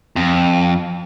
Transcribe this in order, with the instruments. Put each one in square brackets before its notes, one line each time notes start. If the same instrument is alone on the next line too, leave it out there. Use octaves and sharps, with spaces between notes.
[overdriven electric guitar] F2